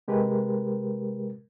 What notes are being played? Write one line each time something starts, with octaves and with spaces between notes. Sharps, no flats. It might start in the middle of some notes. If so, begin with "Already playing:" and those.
C3 G#3 G4 A#4 B4